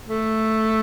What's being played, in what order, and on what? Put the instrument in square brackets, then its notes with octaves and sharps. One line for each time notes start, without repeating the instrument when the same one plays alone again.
[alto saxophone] A3